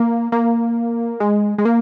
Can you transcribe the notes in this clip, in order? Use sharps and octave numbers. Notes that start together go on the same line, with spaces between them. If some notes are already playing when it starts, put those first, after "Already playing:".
Already playing: A#3
A#3
G#3
G#3
A#3